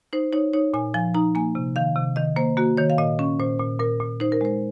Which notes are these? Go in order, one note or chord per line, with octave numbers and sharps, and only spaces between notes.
D#4 C5
D#4 C#5
D#4 C#5
A#2 G#5
F3 G#5
D#4 A#5
A#3 G#5
C3
D#3 F5
C3
D#3 D#5
A#3 C5
A#3 F#4
D#3 C#5
F5
A#2 D#5
C#4
A#2 C5
A#2
A#2 A#4
A#2
D#4 C5
A#4
G#3 C5